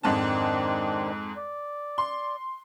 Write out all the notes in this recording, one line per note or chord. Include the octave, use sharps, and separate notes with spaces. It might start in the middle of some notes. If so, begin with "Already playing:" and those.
F2 G#2 D#3 C4 D4 A5
D5
C6